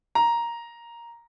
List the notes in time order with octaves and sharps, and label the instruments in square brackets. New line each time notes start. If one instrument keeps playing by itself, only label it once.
[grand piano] A#5